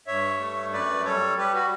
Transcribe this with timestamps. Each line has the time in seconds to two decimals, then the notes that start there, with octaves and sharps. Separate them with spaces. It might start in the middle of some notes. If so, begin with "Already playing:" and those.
0.07 G2 C#5 E5
0.39 A3
0.72 F#2 B4 D5
1.04 G3 A4 C#5
1.37 G3 G4 B4
1.54 F#4